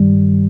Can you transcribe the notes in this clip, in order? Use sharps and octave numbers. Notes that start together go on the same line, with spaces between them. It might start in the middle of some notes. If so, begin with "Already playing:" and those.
Already playing: G2 D#3 G3